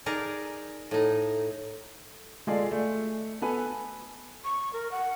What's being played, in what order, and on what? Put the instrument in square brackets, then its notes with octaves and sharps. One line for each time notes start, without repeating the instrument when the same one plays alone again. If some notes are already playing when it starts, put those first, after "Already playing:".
[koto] D#4 G#4 A#4 D5
A2 D#4
[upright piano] G#3 F4 G#4 A4 D5 F5
A3
B3 A4 B4 G#5
[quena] C#6
A#4
F#5